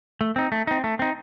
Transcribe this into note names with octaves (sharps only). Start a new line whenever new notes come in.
A3
C4 D#4
A3
C4 D#4
A3
C4 D#4